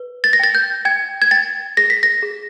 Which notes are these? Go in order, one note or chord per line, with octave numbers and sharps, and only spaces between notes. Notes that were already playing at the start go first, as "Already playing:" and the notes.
Already playing: B4
A6
A#6
G5 A6
G6
G5 G#6
G#6
G5 A6
G#4 A#6
B6
A#6
G#4